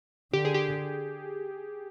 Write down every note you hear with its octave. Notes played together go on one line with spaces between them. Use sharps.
D3 G4
G#4
G4